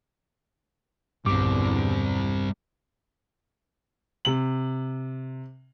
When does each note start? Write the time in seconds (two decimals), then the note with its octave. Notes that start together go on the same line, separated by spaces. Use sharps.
1.26 B1 E2 G2 D3 G3 C4 D6
4.25 C3 F#7